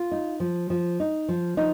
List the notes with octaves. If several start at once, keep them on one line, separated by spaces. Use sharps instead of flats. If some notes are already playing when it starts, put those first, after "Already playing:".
Already playing: F4
D#4
F3
F3
D#4
F3
F3 D#4